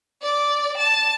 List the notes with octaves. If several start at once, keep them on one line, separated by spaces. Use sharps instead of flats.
D5
A5